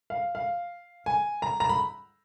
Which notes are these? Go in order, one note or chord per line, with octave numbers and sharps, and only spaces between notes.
F5
F5
G#5
A#5
A#5
B5